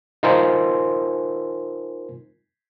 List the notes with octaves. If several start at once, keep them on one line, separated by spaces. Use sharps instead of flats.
D#4 F4 A#4 C5 G#5 C6